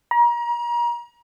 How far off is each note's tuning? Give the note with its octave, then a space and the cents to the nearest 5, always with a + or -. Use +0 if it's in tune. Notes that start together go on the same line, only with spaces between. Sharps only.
A#5 +35